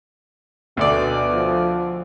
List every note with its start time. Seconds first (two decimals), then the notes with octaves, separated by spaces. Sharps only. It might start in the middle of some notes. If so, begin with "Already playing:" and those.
0.77 D2 B2 A3 D5
1.33 F3